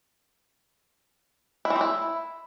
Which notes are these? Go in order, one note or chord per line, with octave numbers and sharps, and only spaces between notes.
E4
E3
C4
E4